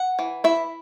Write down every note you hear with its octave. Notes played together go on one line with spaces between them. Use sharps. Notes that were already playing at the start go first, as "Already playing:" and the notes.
Already playing: F#5
E3
E4 E5